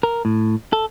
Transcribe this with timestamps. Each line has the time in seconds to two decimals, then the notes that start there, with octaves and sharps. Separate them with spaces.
0.03 A#4
0.25 A2
0.73 A4